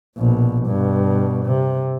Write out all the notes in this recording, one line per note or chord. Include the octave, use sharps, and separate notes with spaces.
A#1 B2
G2 B2
C3